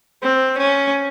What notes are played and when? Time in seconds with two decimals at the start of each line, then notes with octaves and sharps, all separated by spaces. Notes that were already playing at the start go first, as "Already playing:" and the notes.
0.22 C4
0.58 C#4